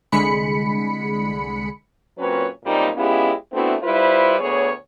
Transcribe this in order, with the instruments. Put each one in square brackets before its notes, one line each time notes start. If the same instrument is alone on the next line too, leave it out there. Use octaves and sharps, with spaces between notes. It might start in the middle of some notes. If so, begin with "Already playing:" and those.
[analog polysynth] C2 D3 G#3 B5 C#7
[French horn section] A#2 F#3 C4 C#4 B4 C#5
F#2 A#2 G3 A#3 C4 D#4
G#3 B3 C#4 E4 F4 G4
A3 B3 C4 D4 E4 F#4
G3 E4 F4 B4 C5
D2 B3 G#4 C#5